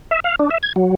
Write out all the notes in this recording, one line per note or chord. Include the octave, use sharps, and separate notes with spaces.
E5
F5
D4
E5
G#6
F#3